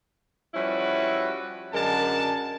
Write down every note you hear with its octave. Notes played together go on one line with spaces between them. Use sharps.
F3 G3 C#4 E4 F#4 B4
F#2 D3 G#3 A#4 A5